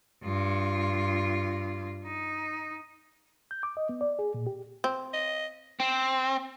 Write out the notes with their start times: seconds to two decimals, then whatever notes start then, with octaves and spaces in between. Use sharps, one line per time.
0.24 G2 F4
2.05 D#4
3.51 G6
3.63 D6
3.77 D#5
3.89 B3
4.01 D5
4.19 G#4
4.34 A#2
4.47 G4
4.84 C4
5.13 D#5
5.80 C4